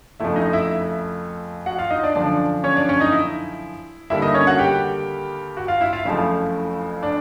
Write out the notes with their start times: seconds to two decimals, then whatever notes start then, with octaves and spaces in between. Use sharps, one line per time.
0.20 F2 C#3 F3 A3 E4 E5
0.36 D#4 D#5
0.53 E4 E5
1.66 F#4 F#5
1.79 F4 F5
1.90 D#4 D#5
2.03 D4 D5
2.15 F#2 D3 F3 D4 D5
2.64 C#4 C#5
2.76 D4 D5
2.89 C#4 C#5
3.00 D#4 D#5
3.12 E4 E5
4.10 D#2 D3 G3 A#3 E4 E5
4.22 D#4 D#5
4.34 C#4 C#5
4.47 F#4 F#5
4.59 G4 G5
5.57 F#4 F#5
5.68 F4 F5
5.81 E4 E5
5.93 F4 F5
6.05 F#1 F2 C#3 F3 A3 E4 E5
7.03 D4 D5